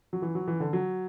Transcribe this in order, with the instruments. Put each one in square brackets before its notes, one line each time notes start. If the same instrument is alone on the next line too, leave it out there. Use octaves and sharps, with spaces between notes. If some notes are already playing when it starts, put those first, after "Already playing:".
[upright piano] F#3
E3
F#3
E3
D3
F#3